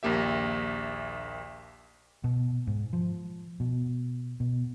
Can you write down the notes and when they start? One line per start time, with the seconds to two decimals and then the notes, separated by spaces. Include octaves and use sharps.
0.03 A#1 D#2 A#3 G4 E5
2.24 B2
2.67 G#2
2.93 F3
3.60 B2
4.40 B2